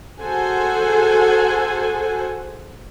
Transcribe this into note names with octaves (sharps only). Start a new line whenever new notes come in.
F#4 G#4 A4 C5 F#5 G#5